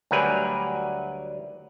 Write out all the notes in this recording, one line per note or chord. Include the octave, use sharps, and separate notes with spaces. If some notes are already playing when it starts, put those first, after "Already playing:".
D2 F#3 G3 A#4 B4 G#5